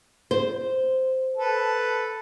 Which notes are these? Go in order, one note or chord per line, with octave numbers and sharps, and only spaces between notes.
C5
A4 B4